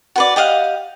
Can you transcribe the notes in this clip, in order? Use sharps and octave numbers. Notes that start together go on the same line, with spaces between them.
F#4 B4 D5
G4 D#5 F5 F#5